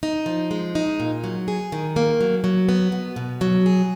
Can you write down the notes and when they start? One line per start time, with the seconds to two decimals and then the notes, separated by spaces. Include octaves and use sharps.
0.03 D#4
0.26 F3
0.51 G#3
0.75 D#4
1.00 A#2
1.24 F#3
1.48 G#4
1.72 D#3
1.96 A#3
2.21 F#3
2.44 F#3
2.69 B3
2.92 B2
3.16 B2
3.41 F#3
3.66 G#4